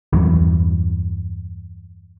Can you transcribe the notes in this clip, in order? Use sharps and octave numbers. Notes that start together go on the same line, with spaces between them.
E2 G2 E3 F#3